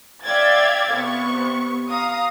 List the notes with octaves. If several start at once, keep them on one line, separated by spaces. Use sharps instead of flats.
D5 E5 F5 G5 G#6 A6
C3 B3 C#6
F5 A#5 D#6